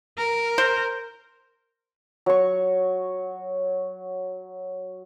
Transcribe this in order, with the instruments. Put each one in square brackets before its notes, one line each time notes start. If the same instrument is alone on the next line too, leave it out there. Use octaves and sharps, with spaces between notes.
[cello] A#4
[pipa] C5
[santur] F#3 C#6